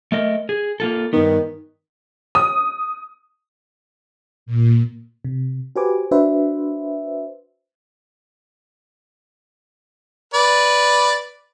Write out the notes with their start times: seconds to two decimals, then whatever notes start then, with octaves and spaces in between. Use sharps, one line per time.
0.12 A3 A#4 D#5
0.49 G#4
0.80 A#3 F4 A4
1.13 G2 D#3 B3
2.35 D#6
4.46 A#2
5.25 C3
5.76 F#4 G4 B4 C5 G#5 D6
6.11 D4 F#4 B4 C5 E5
10.34 B4 D5